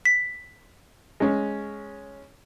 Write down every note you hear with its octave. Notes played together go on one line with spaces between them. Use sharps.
B6
G#3 C#4